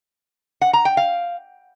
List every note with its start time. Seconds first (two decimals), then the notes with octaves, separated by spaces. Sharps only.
0.61 F#5
0.73 A#5
0.85 G5
0.97 F5